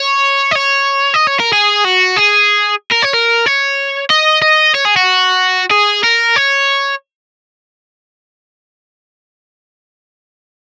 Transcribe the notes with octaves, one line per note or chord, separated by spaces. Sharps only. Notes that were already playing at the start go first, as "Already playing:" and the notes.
Already playing: C#5
D#5
C#5
D#5
C#5
A#4
G#4
F#4
G#4
A#4
C#5
A#4
C#5
D#5
D#5
C#5
G#4
F#4
G#4
A#4
C#5